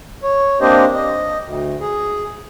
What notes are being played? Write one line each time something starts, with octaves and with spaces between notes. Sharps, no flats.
C#5
A#3 C4 D4 G4 C5 D#5
D#5
D2
G#4